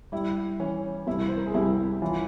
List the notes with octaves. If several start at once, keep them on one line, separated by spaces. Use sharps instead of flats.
G3 E4
E3 C#4
C2 E4
C5
A#4
G#4
C2 E4 G4
E3 C#4 F4